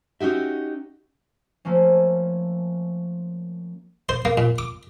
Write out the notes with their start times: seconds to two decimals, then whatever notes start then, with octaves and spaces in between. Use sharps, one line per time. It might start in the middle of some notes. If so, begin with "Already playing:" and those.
0.20 C#4 D#4 F#4 G4 E5
1.65 F3 A3 A#3 C#4
4.09 C5
4.25 A#3
4.38 A#2
4.58 D6